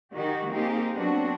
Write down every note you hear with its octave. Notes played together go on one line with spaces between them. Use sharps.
D#3 D#4 F#4 G4
A#3 C4 D#4 G4 G#4
F#3 B3 C4 D4 F#4